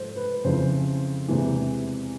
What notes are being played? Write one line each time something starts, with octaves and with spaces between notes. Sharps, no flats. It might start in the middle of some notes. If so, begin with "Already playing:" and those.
Already playing: G#2 F3 A3 C5
B4
F2 C#3 E3 C5
E2 C3 E3 G#3